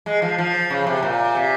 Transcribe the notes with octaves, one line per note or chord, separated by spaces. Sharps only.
G#3
F3
F3
C#3
C3
A#2
C3